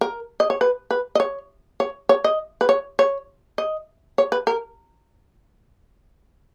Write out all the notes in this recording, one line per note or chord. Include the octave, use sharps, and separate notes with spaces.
A#4
D#5
C#5
B4
B4
D#5
C#5
C#5
C#5
D#5
B4
C#5
C#5
D#5
C#5
B4
A#4